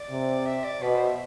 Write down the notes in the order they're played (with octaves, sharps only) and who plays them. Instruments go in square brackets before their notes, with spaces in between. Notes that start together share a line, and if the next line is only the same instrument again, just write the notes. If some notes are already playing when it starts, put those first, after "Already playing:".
Already playing: [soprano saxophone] D5
[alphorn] C3
[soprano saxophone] E5
D5
[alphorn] B2 [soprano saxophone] B4
[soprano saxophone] C5
E5